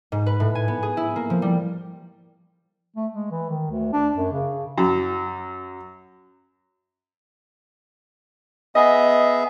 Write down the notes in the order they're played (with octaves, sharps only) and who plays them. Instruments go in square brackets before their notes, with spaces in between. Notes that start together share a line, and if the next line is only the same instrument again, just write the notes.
[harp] G#2
B4
A2
G#5
B3
G#4
E4
A#3
F3
G3
[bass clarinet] A3
G#3
E3
D#3
D2
D4
F#2
C#3
[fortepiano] F#2
[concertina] B3 G#4 E5 [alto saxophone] D#5